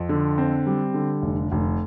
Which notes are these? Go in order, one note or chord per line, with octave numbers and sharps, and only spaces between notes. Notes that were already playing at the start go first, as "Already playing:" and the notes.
Already playing: F2
D3
C4
G3
D3
F1
F1